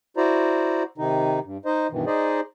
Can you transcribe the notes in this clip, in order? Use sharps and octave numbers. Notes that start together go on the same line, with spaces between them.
E4 F#4 C5 D5 A#5
C3 D#3 D#4
G2
D#4 C5 D#5
G2 B2 D#3 E3
D#4 G#4 C5 D5 D#5